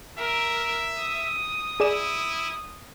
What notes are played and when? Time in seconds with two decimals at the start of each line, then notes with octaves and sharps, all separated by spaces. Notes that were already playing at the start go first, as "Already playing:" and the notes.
0.18 A#4 E5
0.99 D#6
1.80 E4 G#4 D5 E7